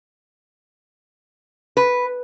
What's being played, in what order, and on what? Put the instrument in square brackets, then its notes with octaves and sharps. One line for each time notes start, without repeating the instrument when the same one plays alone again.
[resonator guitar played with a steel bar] B4